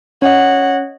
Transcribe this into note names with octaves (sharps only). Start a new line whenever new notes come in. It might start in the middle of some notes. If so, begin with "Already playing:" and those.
C#4 C#5 D#5 F#5